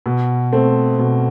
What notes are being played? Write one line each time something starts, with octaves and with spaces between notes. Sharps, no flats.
B2
A3 C4
B2